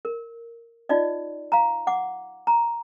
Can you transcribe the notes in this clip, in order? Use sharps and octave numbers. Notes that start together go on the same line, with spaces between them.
A#4
D#4 F4 D5 D#5
F5 A#5
F#5 D6
A#5